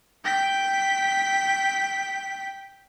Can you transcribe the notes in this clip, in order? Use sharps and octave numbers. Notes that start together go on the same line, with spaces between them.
G5 B6